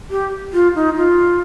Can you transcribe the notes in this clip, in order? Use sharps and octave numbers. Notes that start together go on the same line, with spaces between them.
G4
F4
D#4
F4